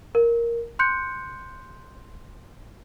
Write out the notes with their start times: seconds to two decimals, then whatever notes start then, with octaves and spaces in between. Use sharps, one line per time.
0.15 A#4
0.79 C6 F#6 G6 C#7